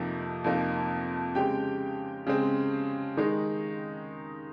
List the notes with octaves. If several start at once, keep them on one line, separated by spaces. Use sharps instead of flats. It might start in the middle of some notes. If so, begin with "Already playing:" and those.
Already playing: F2 C3 F3 A#3 D#4
F2 C3 F3 A#3 D#4
C#3 G#3 C4 G4 G5
C#3 G#3 C4
D#3 G#3 D#4